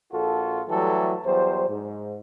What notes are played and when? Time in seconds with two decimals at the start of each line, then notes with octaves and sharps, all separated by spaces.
0.12 A#1 F4 F#4 A4
0.69 E3 F#3 G3 A3 G4 A4
1.26 E2 F#3 G3 C5
1.68 G#2